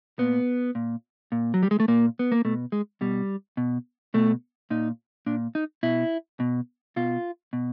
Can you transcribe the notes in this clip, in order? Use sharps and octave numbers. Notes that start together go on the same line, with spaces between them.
A#2 B3
A#2
A#2
F#3
G3
G#3
A3
A#2 A#3
B3
A#3
B2 A3
G#3
B2 G3
B2
B2 A3
A#2 D#4
A#2 D4
D#4
B2 E4
B2
B2 F4
B2